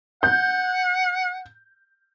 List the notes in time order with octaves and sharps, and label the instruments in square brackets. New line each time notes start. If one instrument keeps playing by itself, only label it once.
[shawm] F#5 [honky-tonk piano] G6